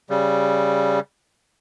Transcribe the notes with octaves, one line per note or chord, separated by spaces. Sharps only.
C#3 G3